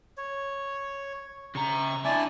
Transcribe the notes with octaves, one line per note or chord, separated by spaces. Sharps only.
C#5
C#3 A#5 C#6
D4 E4 D5 G#5 A5